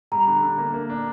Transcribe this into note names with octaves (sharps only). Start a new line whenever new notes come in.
G3 A#5
D3
D3
A#3
A#3
D4